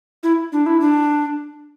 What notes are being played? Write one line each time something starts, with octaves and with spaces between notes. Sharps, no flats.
E4
D4
E4
D4